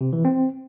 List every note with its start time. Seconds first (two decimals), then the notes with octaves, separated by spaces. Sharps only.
0.01 C3
0.13 E3
0.25 C4